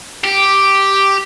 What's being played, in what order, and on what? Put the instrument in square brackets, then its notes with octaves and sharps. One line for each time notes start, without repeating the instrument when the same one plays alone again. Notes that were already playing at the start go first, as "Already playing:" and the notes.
[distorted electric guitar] G4